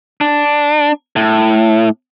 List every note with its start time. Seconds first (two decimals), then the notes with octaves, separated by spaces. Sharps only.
0.21 D4
1.16 A2